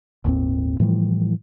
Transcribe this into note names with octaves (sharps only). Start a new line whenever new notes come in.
G1 D#2 A2 C4
A2 E3 F3 G3